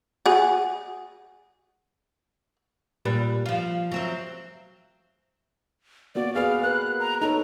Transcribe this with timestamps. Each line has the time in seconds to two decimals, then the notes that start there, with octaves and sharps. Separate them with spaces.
0.26 F#4 G#4
3.05 A#2 G3 B4
3.46 F3 F4
3.92 F#3 C4 E5
6.15 A#3 B3 F#4 D5
6.35 B3 G#4 B4 F5
6.63 A#4 B4 F#6
7.00 A#5
7.21 D#4 A4 C#5 A#5